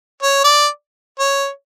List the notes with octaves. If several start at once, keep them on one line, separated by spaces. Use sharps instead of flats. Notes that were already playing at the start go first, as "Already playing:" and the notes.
C#5
D5
C#5